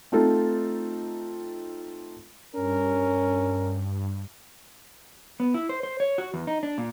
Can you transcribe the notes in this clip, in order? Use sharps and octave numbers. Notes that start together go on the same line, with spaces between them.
A3 C4 D#4 F4 A4
G2 C#4 A#4
B3
E4
C5
C5
C#5
F#4
E2
D#4
D4
A#2